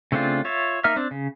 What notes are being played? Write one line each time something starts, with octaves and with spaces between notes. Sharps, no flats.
C#3 A3 C4 D4 F4
F4 C#5 E5
A#3 D#4 E5 F6
C4 D4
C#3